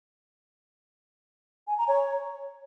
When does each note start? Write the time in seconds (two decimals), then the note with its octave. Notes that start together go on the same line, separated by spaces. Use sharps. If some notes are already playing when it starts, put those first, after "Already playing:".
1.67 G#5
1.78 A#5
1.88 C#5